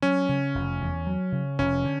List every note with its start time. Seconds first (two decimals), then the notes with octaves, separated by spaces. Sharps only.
0.02 F#3 C#4
0.29 C#3
0.55 F1
0.81 E2
1.07 F#3
1.32 C#3
1.59 F1 C#4
1.84 D3